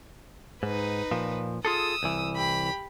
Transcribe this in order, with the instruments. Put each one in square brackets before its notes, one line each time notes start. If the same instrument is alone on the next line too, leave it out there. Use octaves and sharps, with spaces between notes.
[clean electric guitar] G#2 [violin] D#4 B4
[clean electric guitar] A#2 F3
[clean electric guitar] F4 G#4 A4 [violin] D#6 E6
[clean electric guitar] C2 E3
[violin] G4 B5